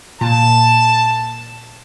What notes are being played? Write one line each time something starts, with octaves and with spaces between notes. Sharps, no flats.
A#2 A5